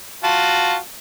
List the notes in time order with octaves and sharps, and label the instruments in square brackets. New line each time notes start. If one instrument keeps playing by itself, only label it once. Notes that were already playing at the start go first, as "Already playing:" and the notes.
[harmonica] F4 F#4 A5